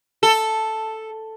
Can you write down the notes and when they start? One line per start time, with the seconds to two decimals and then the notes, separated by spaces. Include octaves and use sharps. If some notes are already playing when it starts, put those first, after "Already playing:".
0.23 A4